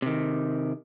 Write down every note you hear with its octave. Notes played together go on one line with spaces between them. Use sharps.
C3 D#3